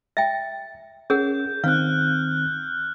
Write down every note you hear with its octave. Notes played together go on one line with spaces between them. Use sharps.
E5 G5 A6
C#4 G#4 A#4 F#5 G6
D#3 C4 F5 F6 F#6